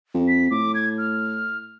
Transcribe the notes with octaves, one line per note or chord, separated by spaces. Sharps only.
F2
B6
A2 D6
G#6
F6